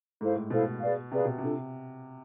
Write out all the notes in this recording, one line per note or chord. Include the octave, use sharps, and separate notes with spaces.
G#2 E4 A4 C5 F5
A2
B2 E4 A4 C5 F5
G#4 B4 D5 F5
C3 G#4 B4 D5 F5
B2
C3 D4 F4 A4